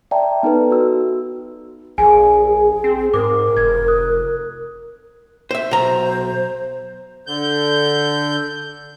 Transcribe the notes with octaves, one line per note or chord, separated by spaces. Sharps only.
D5 E5 G5 A5 A#5
B3 D#4 A4 B4
F#4 E6
A#1 G#4 G#5
C4
G#2 A#4 D6
F1 G#6
D#6 F#6
C5 E5
B1 C5 A#5
D3 G6